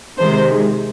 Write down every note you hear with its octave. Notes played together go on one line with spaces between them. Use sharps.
C3 D#3 G#3 C5